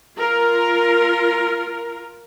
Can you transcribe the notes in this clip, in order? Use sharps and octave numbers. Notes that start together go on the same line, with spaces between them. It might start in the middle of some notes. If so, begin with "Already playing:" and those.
F4 A#4